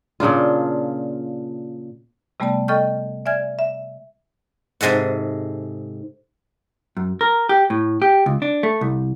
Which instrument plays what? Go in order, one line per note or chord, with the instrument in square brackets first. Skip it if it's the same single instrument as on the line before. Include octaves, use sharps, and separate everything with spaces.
[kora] A#2 C#3 D4 F4
[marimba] C3 G3 A3 B3 D5 A5
A4 D#5 G5 C#6 F6 G6
D5 E5 G#5 F6 G#6
E5
[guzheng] G#2 C3 G#3 A4 F#5
[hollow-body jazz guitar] F#2
A#4
G4
A2
G4
C#2
D4
A3
C2